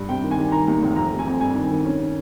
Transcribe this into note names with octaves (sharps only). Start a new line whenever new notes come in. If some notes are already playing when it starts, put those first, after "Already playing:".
Already playing: G2
C3 G5
D#3
G#5
G3
D#3 A#5
D#2
F1
F2 A#5
F1
G#5
F2
G2 G#5
D#3
D#3
C#4